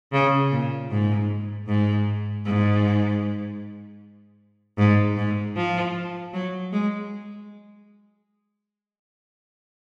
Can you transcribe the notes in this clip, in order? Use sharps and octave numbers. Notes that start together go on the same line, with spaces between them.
C#3
A#2
G#2
G#2
G#2
G#2
G#2
F3
F#3
G#3